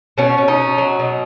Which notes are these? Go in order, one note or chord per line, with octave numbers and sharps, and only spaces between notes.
B2 C#4
C#4
D#4
B2
F#3
B2